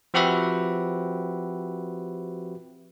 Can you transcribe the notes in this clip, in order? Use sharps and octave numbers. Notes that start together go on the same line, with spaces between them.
F3 C4 F#4 G4 B4 E5